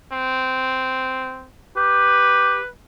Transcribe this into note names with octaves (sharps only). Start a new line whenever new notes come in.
C4
G4 B4